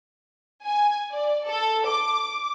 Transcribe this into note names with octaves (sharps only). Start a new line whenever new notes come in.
G#5
D5
A4
D6